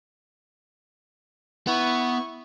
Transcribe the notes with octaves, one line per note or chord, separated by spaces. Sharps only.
B3 E4 C#6